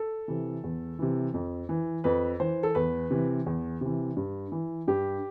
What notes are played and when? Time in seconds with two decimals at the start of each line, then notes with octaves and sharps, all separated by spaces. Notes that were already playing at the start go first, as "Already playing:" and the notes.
Already playing: A4
0.28 C3 E3
0.64 E2
0.99 C3 E3
1.34 F2
1.69 E3
2.04 F2 B4
2.40 E3 C5
2.63 A4
2.75 E2 B4
3.10 C3 E3
3.46 E2
3.81 C3 E3
4.17 G2
4.52 E3
4.87 G2 G4